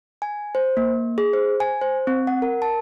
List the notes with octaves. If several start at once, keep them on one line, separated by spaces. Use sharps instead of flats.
G#5
C5
A#3
G#4
C5
G#5
C5
C4
F#5
A#4
A5